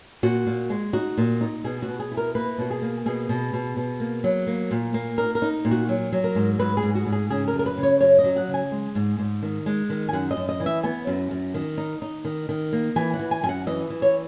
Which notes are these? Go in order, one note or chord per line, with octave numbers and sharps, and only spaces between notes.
A#2 F#4
A#2
G#3
D#4 F#4
A#2
D#4
B2 G#4
F#4
B2
G#4
E4
A#4
A#3 B4
B2 F#4
G#4
A#3
B2 G#4
B2
B2
B2
A#3
F#3
A#3
A#2
A#3
D#4 A#4
A#4
D#4
A#2
F#4
F#3
F#3
A#4
G#2
G#2 B4
G#4
G#2
F#4
G#2
G#4
C#3 G#4
A#4
F#2
A#4
B4
C#3
C#5
F#2 C#5
D#5
F#3
F#5
C#3
G#5
G#3
G#2
G#2
D#3
G#3
D#3
G#5
F#2 F#5
D#5
F#2
D#5
E3
E5
B3 G#5
F#2
F#2
D#3
D#4
D#4
D#3
D#3
A#3
E3 G#5
F#5
E3
G#5
F#2 G#5
F#5
E3 D#5
E3
C#5